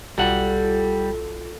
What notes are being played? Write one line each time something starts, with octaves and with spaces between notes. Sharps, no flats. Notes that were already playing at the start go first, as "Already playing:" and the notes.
B1 G3 F4 A4 F#5